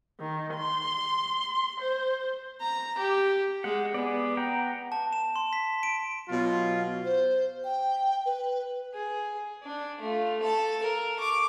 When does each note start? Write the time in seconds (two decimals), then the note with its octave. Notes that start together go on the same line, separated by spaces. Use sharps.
0.20 D#3
0.54 C6
1.81 C5
2.61 A#5
2.98 G4
3.64 G#3 F#5
3.94 B3 G#4 D5
4.37 F#5 G5 A#5
4.92 A5
5.13 E7
5.36 C6
5.53 B6
5.83 D7
6.29 B2 F#3 F4
7.05 C5
7.64 G5
8.26 B4
8.94 G#4
9.63 D4
10.00 A3 F4
10.41 A4 A5
10.83 A#4
11.18 C#6 D6